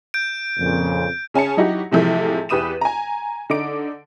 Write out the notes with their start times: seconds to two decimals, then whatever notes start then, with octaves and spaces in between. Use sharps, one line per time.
0.14 G6 D7
0.59 F2 A#2 C#3
1.34 C#3 C#4 G#5 A5 C#7
1.57 F#3 D#4 E4 F#4 G4
1.91 A2 C3 E3 F3 G#3 A3
2.49 E2 G4 B4 D#6 D#7 E7
2.81 G#5 A#5
3.50 D3 D#4 D6 D7